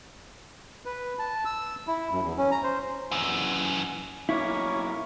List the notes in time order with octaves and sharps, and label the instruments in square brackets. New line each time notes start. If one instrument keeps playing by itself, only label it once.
[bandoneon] B4
A5
E6
E4
F#2
E2
C#4
A#5
C5
[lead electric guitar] F#2 E3
[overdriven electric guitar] B1 A#3 [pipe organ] C#4 C#5 C#6 [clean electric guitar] E4